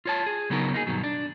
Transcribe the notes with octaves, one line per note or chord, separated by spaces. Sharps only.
F4 C#5 A5
G#4
C#3 F#3 B3 D#4 F#4 A#4
A#3 D#4 E4 G#4
G2 B2 D#3 F#3
D4